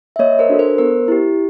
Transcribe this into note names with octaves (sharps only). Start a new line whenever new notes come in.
E5
A#3 C#5 D#5
A#4 C5
D4 F#4 A4
A#4 C5
B3 A#4 C5
E4 G4